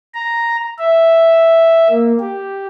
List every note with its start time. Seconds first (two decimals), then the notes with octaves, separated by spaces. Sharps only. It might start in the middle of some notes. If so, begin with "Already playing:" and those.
0.14 A#5
0.79 E5
1.90 A#3
2.20 G4